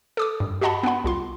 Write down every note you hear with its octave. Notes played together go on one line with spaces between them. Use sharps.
A4 D6 D#6
G2
F#4 G4 D#5 F#5 A5 B5
B3 D4 F#5 B5
C2 F4 C6